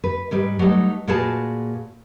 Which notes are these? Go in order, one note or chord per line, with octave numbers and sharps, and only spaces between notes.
B4
G#2 G3 B4
F#3 G3 A3 C4 D#4
A#2 F4 F#4 G#4 B4 A5